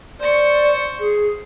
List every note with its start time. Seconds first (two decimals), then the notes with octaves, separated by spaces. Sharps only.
0.19 C5 D5 C#6
0.99 G#4